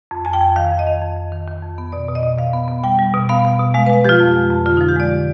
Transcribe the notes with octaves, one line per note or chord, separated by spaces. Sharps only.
F2
F2 G#5
G5
F2
D#3 F5
F2
D#5
D#3
F2
F2
D#3
D#3
F2
B3
B2 D5
B2
D#5
B2
B2 F5
B3
B3
G3 G5
G3
B2
B3 F5
B3
B2
G#3 F5
G#3 B4
F3 F4 G4
F2
G#3
F2
D3 F4
F3 D#4
G4
G#3 D5
D3